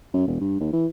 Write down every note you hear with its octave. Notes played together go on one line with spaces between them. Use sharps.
F#2
E1
G2
D#2
E3